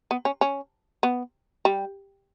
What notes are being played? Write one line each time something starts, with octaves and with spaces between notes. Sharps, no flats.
B3
C#4
C#4
B3
G3